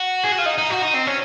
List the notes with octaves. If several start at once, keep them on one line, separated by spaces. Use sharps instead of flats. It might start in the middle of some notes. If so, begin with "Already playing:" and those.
Already playing: F#4
G#4
F#4
F4
D#4
D#4
F#4
D#4
C4
C#4